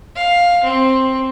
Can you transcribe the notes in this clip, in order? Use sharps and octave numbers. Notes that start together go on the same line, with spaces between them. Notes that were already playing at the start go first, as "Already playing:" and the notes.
F5
C4